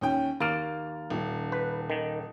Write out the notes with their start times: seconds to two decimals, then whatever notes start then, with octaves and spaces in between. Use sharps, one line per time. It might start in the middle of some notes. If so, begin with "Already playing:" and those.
0.01 D#2 C#4 G5
0.40 D#2 A#3 F6 A6
1.10 D#1
1.52 B4
1.90 D#3